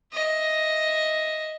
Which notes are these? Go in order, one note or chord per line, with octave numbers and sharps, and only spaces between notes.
D#5 E5